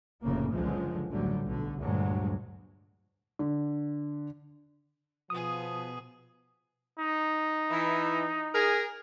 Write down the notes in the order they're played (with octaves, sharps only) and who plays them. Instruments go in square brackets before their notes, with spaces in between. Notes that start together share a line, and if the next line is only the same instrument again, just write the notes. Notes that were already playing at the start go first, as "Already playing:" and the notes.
[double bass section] F1 A2 C#3 A#3
F#1 C#2 D3 F3 G#3
A1 D2 D3 F#3 G3
B1 D3
D2 G2 A#2 F#3 G#3
[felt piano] D3
[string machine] B2 [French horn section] F3 [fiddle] B3 G#4 [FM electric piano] D#6
[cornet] D#4
[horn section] E3
G#4 A#4